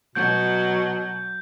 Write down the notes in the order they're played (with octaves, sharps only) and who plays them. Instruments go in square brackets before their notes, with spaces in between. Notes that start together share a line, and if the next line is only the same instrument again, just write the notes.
[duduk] B2 [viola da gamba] F#3 [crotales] G6